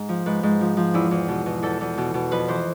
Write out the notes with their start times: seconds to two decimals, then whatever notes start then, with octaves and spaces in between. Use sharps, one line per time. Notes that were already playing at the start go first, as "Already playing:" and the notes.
Already playing: G#2
0.09 F3
0.26 G#2 B4
0.43 G#2
0.61 F3
0.77 F3
0.94 E2 E4
1.11 E2
1.28 B2
1.46 B2
1.62 E2 A4
1.81 E2
1.98 B2
2.14 B2
2.31 F2 B4
2.48 E3 C5